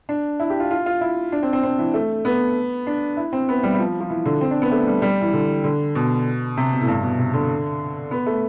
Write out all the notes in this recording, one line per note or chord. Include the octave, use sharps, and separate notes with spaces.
D4
E4
G4
F4
F4
F4
E4
D4
C4
C4
C4
E3
A3
B3
D4
E4
C4
B3
G3
G3
F3
F3
E3
D3
C4
D4
B3
A3
G3
G3
E3
D3
D3
B2
C3
B2
A2
G2
B2
C3
D3
B3
A3